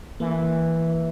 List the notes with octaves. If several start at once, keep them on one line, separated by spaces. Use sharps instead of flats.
E3 A#3